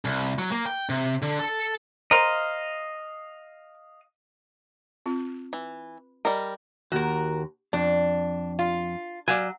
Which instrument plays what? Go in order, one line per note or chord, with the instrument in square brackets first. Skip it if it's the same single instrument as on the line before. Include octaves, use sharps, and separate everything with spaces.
[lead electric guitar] C2
F#3
A#3
G5
C3
D3
A4
[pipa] A#4 C5 [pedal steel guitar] D#5 F5
[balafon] C4 F4
[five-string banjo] E3
[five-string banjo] G3 A#4 [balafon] D#5
[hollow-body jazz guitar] D#2 [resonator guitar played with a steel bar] F#4 A#4
[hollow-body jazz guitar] F2 [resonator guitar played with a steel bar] D4
[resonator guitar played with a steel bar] F4
[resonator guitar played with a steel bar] F#3 [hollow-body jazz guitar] D5 F5 G#5